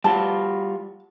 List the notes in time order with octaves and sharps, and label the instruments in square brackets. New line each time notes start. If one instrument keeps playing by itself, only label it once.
[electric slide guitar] G3 F4 F#4 [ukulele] A5